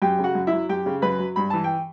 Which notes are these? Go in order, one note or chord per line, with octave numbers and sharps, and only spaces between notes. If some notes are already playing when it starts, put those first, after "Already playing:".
F#2 G4 G5
C#3
F#4 F#5
F#2
E4 E5
F#3
F#2 G4 G5
C#3
F#2 B4 B5
F#3
G2 B5
E3 A5
G5